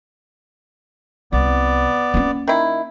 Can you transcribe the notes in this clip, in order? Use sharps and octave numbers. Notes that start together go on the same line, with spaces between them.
C2 B3 D5
A#3 C#4
D#3 E4